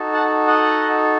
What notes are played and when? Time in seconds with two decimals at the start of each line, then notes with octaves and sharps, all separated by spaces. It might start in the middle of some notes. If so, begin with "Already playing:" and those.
Already playing: D#4 F#4 A4
0.13 F#5 A5
0.47 D#5 F#5